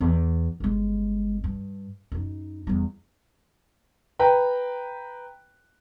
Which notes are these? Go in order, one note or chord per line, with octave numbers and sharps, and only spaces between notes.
E2
G1 G#3
G2
F#2 D#4
E2 G3
B4 G5 A#5